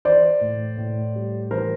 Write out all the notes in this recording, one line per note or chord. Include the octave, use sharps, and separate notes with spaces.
E3 C5 D5
A2
A2
G3
E3 A#4 C5